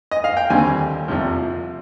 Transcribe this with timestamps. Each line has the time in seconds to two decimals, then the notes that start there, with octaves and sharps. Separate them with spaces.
0.11 D#5
0.24 F5
0.37 G5
0.50 D#2 D3 G3 C4 G#5
1.08 C2 C3 F3